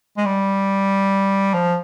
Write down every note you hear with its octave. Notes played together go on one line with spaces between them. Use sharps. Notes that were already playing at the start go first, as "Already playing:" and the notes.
G#3
G3
F3